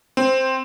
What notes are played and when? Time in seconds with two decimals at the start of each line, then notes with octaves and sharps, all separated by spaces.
0.17 C4